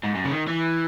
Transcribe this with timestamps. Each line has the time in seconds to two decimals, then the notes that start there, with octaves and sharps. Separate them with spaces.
0.03 G#2
0.15 F#2
0.25 C#3
0.31 D#3
0.48 E3